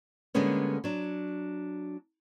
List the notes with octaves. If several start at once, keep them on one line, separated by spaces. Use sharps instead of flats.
D3 G3 G#3 A#3 B3 C#4
F#3 D4